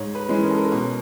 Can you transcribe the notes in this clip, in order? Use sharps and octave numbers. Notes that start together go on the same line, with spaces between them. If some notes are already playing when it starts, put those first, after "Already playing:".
Already playing: G#2 C#5
B4
E3 G#3 C#4
A#4
A4
A#4
B2